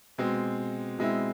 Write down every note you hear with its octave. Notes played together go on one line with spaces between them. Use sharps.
B2 G#3 C4
B2 G#3 C4 E4